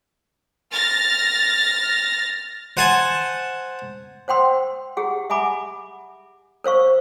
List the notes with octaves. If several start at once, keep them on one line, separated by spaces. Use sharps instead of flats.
F6 A6 A#6
C5 F#5 G#5 A5
C5 F#5 G5 C6 E6
G4 G#4 F#5
E5 F#5 G#5 B5 D6
A#4 C5 F5 C#6